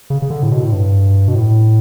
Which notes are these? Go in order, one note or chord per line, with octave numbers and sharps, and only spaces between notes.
C#3
C#3
D3
A2
B2
A2
G2
B2
A2